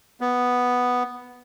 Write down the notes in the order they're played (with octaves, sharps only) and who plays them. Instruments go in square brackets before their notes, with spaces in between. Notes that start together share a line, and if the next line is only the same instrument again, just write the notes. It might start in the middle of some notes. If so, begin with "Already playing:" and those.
[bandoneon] B3